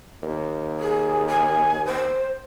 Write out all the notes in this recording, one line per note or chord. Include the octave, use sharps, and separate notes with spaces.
D#2
G#4
G#5
C5